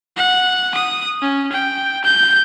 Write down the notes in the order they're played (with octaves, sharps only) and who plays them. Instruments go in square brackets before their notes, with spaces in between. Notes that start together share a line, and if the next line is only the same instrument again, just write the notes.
[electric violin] F#5
D#6
C#4
G5
G6